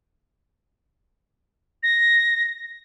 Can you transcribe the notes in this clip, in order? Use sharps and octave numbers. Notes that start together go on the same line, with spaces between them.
A#6